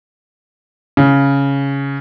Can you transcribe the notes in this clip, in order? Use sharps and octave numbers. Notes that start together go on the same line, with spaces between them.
C#3